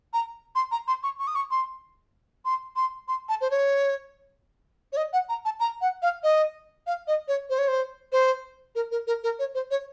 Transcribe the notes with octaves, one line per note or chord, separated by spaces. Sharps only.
A#5
C6
A#5
C6
C#6
C#6
D#6
C#6
C6
C6
C6
C6
A5
C5
C#5
C#5
D#5
F#5
A#5
A5
A#5
F#5
F5
D#5
F5
D#5
C#5
C5
C#5
C5
C5
A#4
A#4
A#4
A#4
C#5
C5
C#5